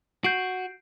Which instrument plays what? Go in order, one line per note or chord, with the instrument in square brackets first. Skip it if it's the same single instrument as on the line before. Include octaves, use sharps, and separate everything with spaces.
[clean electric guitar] F#4 [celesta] G6 C7 D7